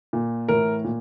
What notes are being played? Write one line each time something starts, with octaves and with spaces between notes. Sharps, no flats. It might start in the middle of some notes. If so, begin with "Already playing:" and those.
A#2
A2 E3 A#4
A#2